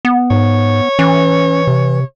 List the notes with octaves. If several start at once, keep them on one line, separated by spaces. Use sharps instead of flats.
B3
G#2 C#5
E3 C#4
C3